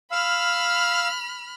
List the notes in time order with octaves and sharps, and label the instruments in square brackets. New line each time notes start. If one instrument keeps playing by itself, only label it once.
[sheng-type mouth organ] F5 E6 [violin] B5 F6